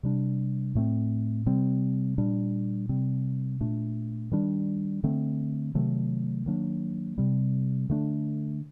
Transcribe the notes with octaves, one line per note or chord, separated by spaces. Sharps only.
C3 G3 D4
A2 A3 C4
C3 G3 C4
A#2 G3 D4
C3 G3 C4
A#2 A3 D4
D#3 G3 D4
D3 A3 C4
C3 D#3 F#3 A3
D#3 F#3 A#3 D4
C3 G3 C4
D3 A3 D4